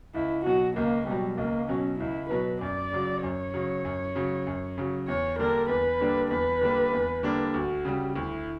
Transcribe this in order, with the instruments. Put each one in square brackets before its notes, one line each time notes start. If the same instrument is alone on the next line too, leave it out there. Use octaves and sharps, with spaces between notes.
[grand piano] C#2 [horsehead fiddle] E4
[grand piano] B2 F#3 [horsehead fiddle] F#4
[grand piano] C#2 [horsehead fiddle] A#3
[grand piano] B2 F#3 [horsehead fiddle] G3
[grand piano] C#2 [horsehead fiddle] A#3
[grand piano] B2 F#3 [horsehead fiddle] C#4
[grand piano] C#2 [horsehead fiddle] E4
[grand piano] B2 F#3 [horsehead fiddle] B4
[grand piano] F#2 [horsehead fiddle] D5
[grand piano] C#3 F#3
[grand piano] F#2 [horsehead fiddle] C#5
[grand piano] C#3 F#3
F#2
C#3 F#3
F#2
C#3 F#3
[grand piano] E2 [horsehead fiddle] C#5
[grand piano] D3 G3 A#3 D4 [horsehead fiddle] A#4
[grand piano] E2 [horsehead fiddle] B4
[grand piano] D3 G3 A#3 D4
[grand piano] E2 [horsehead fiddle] B4
[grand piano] D3 G3 A#3 D4
E2
D3 G3 A#3 D4
[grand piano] D2 [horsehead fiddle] F#4
[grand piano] C#3 G3
[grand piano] D2 [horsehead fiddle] E4